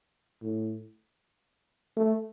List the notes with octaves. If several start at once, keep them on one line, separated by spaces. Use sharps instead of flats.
A2
A3